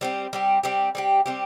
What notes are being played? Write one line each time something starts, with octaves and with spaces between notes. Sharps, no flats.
G3 C4 G4
G3 C4 G4
G3 C4 G4
G3 C4 G4
G3 C4 G4